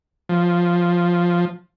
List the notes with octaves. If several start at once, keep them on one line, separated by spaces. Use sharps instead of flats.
F3